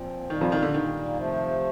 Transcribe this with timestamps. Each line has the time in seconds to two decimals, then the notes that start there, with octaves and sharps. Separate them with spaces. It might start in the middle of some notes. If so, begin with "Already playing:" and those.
Already playing: A#2 F3 C4
0.30 A#2 D#3 G3 A#3
0.41 F2 F3
0.52 D#3
0.62 D3
0.74 D#3
1.17 C3 F3 A3